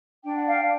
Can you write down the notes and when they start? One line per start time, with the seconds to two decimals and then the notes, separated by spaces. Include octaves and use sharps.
0.24 D4 G5
0.36 F#5
0.47 F5 G5
0.61 D4